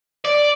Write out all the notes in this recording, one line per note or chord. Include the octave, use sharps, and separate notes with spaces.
D5